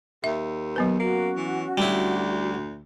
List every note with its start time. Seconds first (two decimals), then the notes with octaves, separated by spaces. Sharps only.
0.24 D#2 E5
0.76 F#3 B3 B4
0.99 A#3 C#4 F#4
1.36 E3
1.78 D2 G3 E4